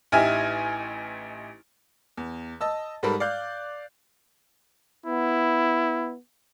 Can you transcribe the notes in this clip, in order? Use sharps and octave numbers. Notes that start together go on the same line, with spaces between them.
A1 D#4 E4 G4 G#5 F6
E2
D#5 A5 E6
G#2 G3 A4 A#4 B5
D5 F5 F#6 G6
B3 E4